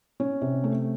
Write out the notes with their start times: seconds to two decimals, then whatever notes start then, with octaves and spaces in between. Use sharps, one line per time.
0.20 C#4
0.41 C3
0.64 A3